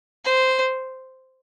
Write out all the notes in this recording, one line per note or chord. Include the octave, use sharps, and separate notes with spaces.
C5